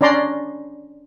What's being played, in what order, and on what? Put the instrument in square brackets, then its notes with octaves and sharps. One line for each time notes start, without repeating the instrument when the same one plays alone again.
[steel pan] C#4 D4 D5 A#5 C6